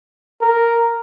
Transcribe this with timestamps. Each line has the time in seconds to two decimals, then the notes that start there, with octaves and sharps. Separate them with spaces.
0.41 A#4